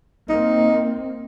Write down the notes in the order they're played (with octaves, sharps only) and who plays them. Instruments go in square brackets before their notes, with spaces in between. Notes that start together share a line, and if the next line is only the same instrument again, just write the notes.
[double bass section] A#3 C4 [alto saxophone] D#4